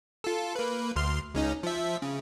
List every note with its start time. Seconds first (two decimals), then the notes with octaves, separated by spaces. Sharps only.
0.24 F4 A4
0.56 A#3 B4
0.96 D2 C6 F6
1.34 C#2 C#4 D#4
1.63 F3 E5
2.02 C#3